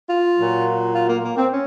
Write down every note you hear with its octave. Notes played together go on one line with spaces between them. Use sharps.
F4
A#2 F#3
F4
A#3
A#3
C4
C#4